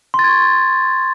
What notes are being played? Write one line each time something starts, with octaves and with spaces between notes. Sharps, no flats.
C6
A6
G#6
C#6